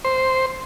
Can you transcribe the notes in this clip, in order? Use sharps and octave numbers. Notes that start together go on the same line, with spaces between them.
C5